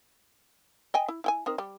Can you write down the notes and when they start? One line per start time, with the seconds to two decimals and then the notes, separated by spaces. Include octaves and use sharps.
0.94 D#5 G5 G#5
1.08 E4
1.24 E4 G5 G#5
1.46 C4 D#4 A#4
1.58 G3 G4